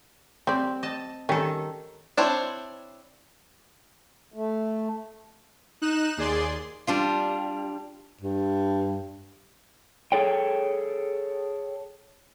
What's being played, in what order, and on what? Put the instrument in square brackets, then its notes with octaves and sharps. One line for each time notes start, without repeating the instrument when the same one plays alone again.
[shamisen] G3 D5 [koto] C4
[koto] D#5 A5
[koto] D#3 A4 [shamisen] G3 C#4
[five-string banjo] C4 D4 E4 C5 C#5
[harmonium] A3
[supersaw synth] D#4 F#6 E7
D#2 G#4 D5 C6
[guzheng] G3 D4 F4
[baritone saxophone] G2
[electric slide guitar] G#4 A4 C#5 G5